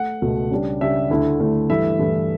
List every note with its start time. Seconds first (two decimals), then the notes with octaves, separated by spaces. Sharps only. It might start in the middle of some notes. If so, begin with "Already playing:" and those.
Already playing: A3 F#5
0.22 C#2 B2 A3
0.51 C#3 G3 D4
0.81 C#3 G3 D4 E5
1.10 D2 D3 A3 E4
1.39 D2 D3 A3 E4
1.69 G2 E3 A3 E4 E5
1.99 G2 E3 A3 E4